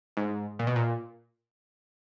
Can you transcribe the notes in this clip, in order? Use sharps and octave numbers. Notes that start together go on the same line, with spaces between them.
G#2
A#2
B2
A#2